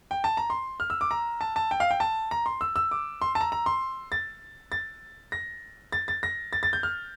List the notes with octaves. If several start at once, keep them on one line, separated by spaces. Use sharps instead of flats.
G5
A5
A#5
C6
F6
E6
D6
A#5
A5
A5
G5
F5
G5
A5
A#5
C6
E6
E6
D6
C6
A5
A#5
A#5
C6
A6
A6
A#6
A6
A6
A#6
A6
A6
G6
F6